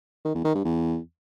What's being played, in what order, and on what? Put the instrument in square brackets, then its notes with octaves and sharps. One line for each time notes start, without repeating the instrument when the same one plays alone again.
[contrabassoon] D#3
E2
D#3
G2
E2